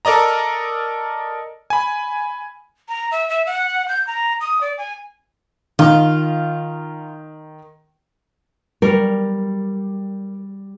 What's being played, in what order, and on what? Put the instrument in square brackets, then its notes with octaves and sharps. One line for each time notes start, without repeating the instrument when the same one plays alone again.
[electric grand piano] A4 A#4 D5 D#5 A#5
G#5 B5
[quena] A#5
E5
E5
F#5
G6
A#5
D#6
D5
G#5
[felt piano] D#3 [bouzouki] F4
[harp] G3 [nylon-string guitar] A#4